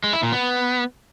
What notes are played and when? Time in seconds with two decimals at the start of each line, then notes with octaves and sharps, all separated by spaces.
0.04 G#3
0.13 E4
0.23 A#2
0.32 B3